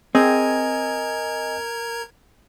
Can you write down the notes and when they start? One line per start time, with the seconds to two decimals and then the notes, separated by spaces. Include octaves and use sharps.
0.15 C4 G#4 A#4 D#5 G5 G#5 A#5 G#6